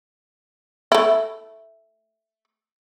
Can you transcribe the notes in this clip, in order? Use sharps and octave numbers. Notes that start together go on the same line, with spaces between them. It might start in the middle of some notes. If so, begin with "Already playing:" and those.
A3 E4